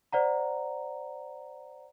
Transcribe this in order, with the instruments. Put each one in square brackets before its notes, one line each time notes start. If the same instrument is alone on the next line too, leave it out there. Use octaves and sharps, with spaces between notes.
[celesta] C5 D5 F#5 A#5